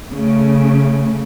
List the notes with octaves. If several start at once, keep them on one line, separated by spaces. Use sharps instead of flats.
C#3 A3